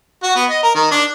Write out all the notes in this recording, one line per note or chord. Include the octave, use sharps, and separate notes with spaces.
F#4
B3
D#5
A#4
D#3
D4